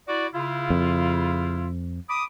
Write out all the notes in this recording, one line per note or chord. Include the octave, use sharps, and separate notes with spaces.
E4 F#4 D5
C#3 E4 F4
F2
B5 D6 D#6